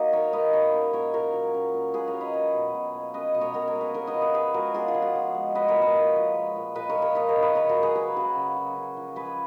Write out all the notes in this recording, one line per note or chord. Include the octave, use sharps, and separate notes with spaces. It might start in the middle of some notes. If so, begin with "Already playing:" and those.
Already playing: A#3 D#4 F#4 D#5
D#3 A#4 C#5
D#3 B4 D#5
A#3 A#4 C#5
C#4
A#2 A#4 C#5
A#2 A#4 C#5
F#3
C#4
A#2
A#2 G#4 B4
A#4 C#5
F#3
B4 D#5
C#4
B2
B2
A#3
C#4 B4 D#5
B2 D#5
A#4 C#5
B2 F#4 A#4
A#4 C#5
A#3
G#4 B4
B3 A#4 C#5
B4 D#5
F3
B4 D#5
F3 G#4 B4
G#3 F#4 A#4
B3 F4 G#4
F4
F3
F#4
F3
G#3
G#3 B4 D#5
A#4 C#5
A#2
B4 D#5
A#2
F3
G#3
A#2
A#2 B4 D#5
A#4 C#5
F3
A#4 C#5
A#3 B4 D#5
A#4 C#5
C#3
B4 D#5
C#3 A#4 C#5
F#4 A#4
F#3
G#4 B4
A#3 G#4 B4
C#3 F#4
C#3
F#3
C#4
F3
F3 G#4 B4